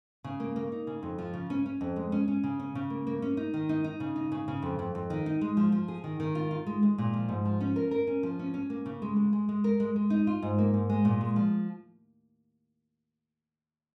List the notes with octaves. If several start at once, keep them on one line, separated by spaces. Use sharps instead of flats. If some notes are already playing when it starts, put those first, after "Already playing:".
C#3
A#3
A#3
D#4
C#3
F2
F3
C#3
C#4
C#4
F2
G#3
C#4
C#4
C#3
C#4
C#3
A#3
A#3
C#4
D#4
D#3
D#4
D#4
C#3
D#4
C#3
C#3
F2
F2
F2
D#3
D#4
G#3
F3
F3
G#4
D#3
D#3
F4
F4
G#3
G#3
A#2
F3
G#2
F3
C#4
A#4
A#4
C#4
F3
C#4
C#4
A#3
C#3
G#3
G#3
G#3
G#3
A#4
G#3
G#3
D#4
F4
G#2
A#3
G#2
G#3
A#2
G#3
F3